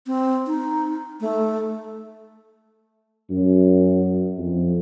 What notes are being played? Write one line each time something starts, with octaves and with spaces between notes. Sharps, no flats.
C4
D#4
A3
F#2
F2